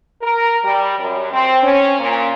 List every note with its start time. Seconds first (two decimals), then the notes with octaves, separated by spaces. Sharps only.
0.22 A#4
0.64 G3
0.99 F#2
1.32 C4
1.63 C#4
1.99 A#2